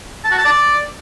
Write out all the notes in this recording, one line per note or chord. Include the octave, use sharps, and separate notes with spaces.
A5
F#4
A5
D5